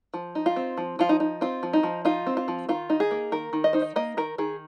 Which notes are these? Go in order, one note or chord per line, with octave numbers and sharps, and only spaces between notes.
F3
D#4
F4
C4
F3
F3 F4
D#4
D#4
C4 F4
F3
D#4
F3
D#4 F4
C4
F4
F3
D#3 F4
D#4
G#4
A#3
D#3 A#4
D#3
D#5
D#4 C5
D#5
A#3 D#5
D#3 A#4
D#3 G#4